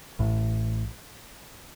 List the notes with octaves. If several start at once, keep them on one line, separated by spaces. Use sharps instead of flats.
A1 A2